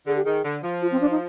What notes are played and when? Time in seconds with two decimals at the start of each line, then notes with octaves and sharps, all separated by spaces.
0.07 D3 G#4
0.16 G4
0.24 D#3 G#4
0.45 D3
0.63 F3
0.82 F4
0.92 C4
1.01 D4
1.11 D#4